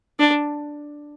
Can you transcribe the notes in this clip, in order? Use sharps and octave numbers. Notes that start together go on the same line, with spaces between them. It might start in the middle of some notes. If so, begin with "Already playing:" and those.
D4